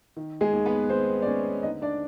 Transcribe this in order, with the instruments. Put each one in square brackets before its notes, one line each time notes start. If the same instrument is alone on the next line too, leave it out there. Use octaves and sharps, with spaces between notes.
[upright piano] D#3
G#3 G#4
D#2
B3 B4
D#2 C4 C5
D5
D#2 C#4 C#5
D3 D#4 D#5
D4 D5